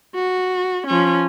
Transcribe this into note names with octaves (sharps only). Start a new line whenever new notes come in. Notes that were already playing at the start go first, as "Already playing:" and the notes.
F#4
F3 C#4